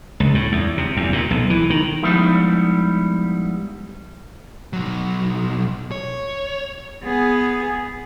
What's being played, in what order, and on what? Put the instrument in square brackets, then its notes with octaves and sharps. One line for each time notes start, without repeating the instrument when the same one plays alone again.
[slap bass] C#2
A2
E2
C3
E2
A#2
B1
E3
D#3
[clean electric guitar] F3 G3 G#3 B3 D#4 E4
[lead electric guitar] B1 F#3
C#5
[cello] B3 G#4